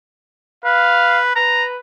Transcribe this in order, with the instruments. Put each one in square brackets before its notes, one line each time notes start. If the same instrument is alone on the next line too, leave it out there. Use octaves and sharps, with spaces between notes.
[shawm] B4 [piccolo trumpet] F5
[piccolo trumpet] B4 [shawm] A#5